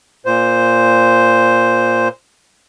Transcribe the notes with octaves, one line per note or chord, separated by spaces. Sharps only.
A#2 C5